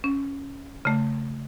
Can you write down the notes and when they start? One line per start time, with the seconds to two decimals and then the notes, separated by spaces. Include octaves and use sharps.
0.04 C#4
0.85 C#3 A3